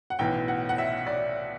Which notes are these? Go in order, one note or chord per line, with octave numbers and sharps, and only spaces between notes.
F#5
B1 A2 E3 G5
F#5
F#5
E5
D5